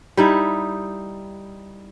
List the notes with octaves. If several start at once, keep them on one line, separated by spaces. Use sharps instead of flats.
G3 D#4 E4